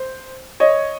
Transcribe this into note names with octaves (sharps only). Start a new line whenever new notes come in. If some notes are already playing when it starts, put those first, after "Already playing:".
Already playing: C5
C#5 D#5